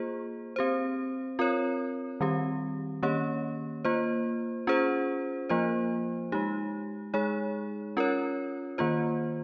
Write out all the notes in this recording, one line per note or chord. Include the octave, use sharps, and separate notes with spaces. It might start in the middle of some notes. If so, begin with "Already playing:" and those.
Already playing: A#3 F4 G#4 C5
C4 G4 C5
C4 F4 A#4 C#5
D#3 G3 C4 G4
D#3 A#3 C#4 G4 C#5
A#3 F4 C5
C#4 F4 G#4 C5
F3 A#3 F4 C5
G#3 D#4 G4
G#3 D#4 G#4 C#5
C#4 F4 A#4 C#5
D#3 A#3 F4 C5